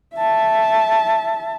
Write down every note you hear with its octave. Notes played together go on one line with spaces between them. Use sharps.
E5 A5